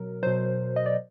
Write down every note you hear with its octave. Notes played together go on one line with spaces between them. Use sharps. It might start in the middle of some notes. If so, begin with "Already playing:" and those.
Already playing: B2 F#3 A#4
B2 F#3 C5
D#5
D5